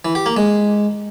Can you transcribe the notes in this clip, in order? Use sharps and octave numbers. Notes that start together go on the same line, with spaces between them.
E3
G4
A#3
G#3